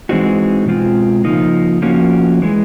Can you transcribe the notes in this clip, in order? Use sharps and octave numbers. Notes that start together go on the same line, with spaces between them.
E3 G#3 C4 D#4 F#4
B2 G#3 C4 F4
C#3 F3 A#3 D#4
F3 A#3 C#4 F#4
E3 G#3